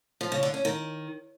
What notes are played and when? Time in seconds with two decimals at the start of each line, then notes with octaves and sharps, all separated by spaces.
0.21 F3
0.32 C#3
0.43 D3
0.54 C#4
0.65 D#3